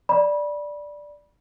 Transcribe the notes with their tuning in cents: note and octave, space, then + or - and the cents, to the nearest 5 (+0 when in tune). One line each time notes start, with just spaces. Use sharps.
D5 +0 B5 -25